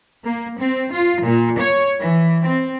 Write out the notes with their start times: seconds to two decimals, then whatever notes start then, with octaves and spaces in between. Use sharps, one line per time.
0.24 A#3
0.58 C4
0.91 F4
1.23 A#2
1.59 C#5
1.99 E3
2.43 C4